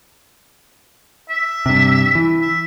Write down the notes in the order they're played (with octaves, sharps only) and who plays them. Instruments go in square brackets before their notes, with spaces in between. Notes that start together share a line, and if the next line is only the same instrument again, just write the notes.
[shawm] E5
[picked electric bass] G2 C3
E3
[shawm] E5